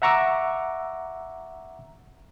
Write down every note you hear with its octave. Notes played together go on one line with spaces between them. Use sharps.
E5 F#5 A#5 C#6 D6 E6